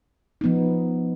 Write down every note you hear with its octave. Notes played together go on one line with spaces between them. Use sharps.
F3 B3 D#4